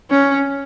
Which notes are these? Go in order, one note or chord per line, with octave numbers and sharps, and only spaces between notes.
C#4